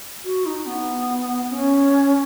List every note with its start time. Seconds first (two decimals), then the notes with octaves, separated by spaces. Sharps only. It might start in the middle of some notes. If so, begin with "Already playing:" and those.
0.25 F#4
0.46 D#4
0.66 B3
1.50 C#4